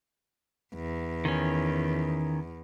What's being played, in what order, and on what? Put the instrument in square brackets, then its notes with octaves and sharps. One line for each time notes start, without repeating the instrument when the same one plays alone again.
[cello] E2
[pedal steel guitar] D#3 C#4